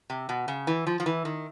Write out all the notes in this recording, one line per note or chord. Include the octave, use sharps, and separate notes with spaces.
C3
B2
C#3
E3
F3
F3
E3
D#3